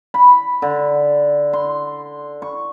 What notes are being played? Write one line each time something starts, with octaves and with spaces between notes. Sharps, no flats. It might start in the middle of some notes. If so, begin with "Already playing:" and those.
B5
D3
C6
C#6